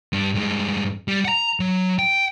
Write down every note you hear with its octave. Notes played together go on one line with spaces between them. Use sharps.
G2 D4
G2 G#3
G3
F#5 A#5
F#3
G5